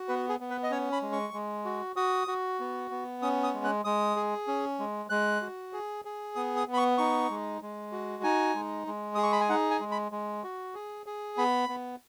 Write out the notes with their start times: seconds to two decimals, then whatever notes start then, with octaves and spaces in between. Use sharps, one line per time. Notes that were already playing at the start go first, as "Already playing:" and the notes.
Already playing: F#4
0.08 B3 B4
0.29 G#4
0.40 B3
0.50 B4
0.63 D#5
0.71 C#4 C#5
0.92 B5
1.02 G#3
1.12 C#6
1.34 G#3
1.65 F#4
1.96 F#4 D#6
2.28 F#4
2.60 B3
2.91 B3
3.22 C#4 D#6
3.43 D#6
3.54 G#3
3.64 F#6
3.84 G#3 D#6
4.16 G#4
4.47 C#4
4.79 G#3
5.10 G#3 F#6
5.41 F#4
5.73 G#4
6.05 G#4
6.35 B3 D#6
6.57 D#6
6.68 B3
6.73 B5
6.78 C#6
6.98 D#4 C#6
7.30 G#3
7.62 G#3
7.92 F#4
8.23 D#4 G#5
8.55 G#3
8.87 G#3
9.15 G#4 D#6
9.23 C#6
9.32 B5
9.40 G#5
9.49 D#4 F#5
9.71 G#5
9.80 G#3
9.91 B5
10.12 G#3
10.44 F#4
10.75 G#4
11.06 G#4
11.37 B3 B5
11.69 B3